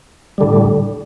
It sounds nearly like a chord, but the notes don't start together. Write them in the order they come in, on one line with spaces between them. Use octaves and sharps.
G3 D3 A2